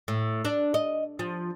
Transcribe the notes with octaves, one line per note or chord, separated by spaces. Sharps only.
A2
D4
D#5
F3